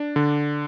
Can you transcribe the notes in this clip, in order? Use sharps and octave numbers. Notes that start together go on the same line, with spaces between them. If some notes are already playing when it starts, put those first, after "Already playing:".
Already playing: D4
D3